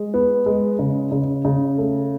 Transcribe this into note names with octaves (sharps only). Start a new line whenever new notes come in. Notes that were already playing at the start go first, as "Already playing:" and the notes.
Already playing: G#3
B3
G#3
C#3
C#3
C#3
A3